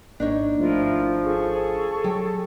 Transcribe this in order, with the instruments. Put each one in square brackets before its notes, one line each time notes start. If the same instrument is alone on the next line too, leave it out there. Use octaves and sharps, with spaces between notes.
[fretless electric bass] G#1 A#3 [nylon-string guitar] D4 D#4 C#5
[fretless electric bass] G#1 A3 [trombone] F3 [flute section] E4 F4 A#4
[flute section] G#4 A4 C#6
[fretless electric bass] F#3 [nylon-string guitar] G4